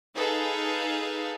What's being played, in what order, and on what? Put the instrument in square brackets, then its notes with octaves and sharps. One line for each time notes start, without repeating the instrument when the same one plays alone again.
[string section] D#4 G#4 A4 B4 F5